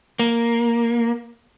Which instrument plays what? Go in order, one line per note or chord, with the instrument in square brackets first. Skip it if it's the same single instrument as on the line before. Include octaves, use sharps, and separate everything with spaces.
[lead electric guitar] A#3